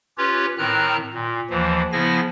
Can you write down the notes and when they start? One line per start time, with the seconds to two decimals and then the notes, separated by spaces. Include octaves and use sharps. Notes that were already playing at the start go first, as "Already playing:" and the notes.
0.18 C#4 F4 G4 B4 C#5
0.58 A2 D#3 C4 A#5 F6 F#6
1.13 A#2
1.50 D#2 E3 F3
1.92 C#3 F3 B3 E4 G#5 A#6